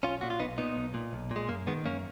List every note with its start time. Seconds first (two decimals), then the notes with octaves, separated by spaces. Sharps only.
0.03 B1 C#4 F4
0.21 A#2 F#4
0.30 F4
0.40 B1 B3 D#4
0.58 A#2 B3 D#4
0.77 B1
0.94 A#2
1.13 B1
1.31 A#2 G#3
1.49 F#2 A#3
1.67 D#3 G#3 B3
1.86 F#2 A#3 C#4